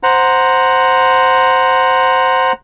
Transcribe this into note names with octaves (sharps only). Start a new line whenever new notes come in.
C5 F#5 A#5